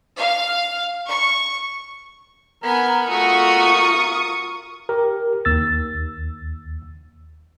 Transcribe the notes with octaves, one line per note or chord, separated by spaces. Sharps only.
F5
C#6
B3 A#4 G#5
A3 F4 F#4 A#4 C#6 D#6
G4 A#4
D#2 E6 A6